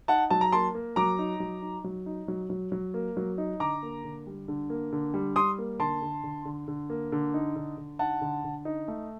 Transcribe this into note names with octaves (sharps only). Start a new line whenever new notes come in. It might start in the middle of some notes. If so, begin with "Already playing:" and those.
D#4 F#5 A5
F#3 A5
A#5
A#3 A5 C6
A#3
F#3 A#5 D6
D#4
F#3
D#4
F#3
D#4
F#3
F#3
F#3
A#3
F#3
D#4
D3 A#5 D6
A#3
D3
G3
D3
A#3
D3
G3
G3 C6 D#6
A#3
D3 A5 C6
D3
D3
D3
D3
A#3
D3
D#4
D3
D3
D#4 F#5 A5
D3
D3
D#4
A3